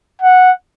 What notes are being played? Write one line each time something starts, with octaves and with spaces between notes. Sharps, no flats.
F#5